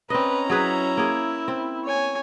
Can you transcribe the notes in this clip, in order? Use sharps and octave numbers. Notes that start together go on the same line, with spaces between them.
C4 C#4 B4 D#5 A#5
F#3 E4 G#4 B4
A#3 G#4
C4
C#5 G#5